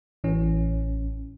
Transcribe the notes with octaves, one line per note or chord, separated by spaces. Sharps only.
A1 E3 C#4